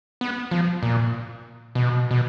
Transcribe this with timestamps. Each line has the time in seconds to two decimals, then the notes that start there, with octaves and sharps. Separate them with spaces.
0.21 B3
0.51 F3
0.83 A#2
1.75 B2
2.11 B2